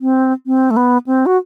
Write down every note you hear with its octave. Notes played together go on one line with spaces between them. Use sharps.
C4
C4
A3
B3
C4
F#4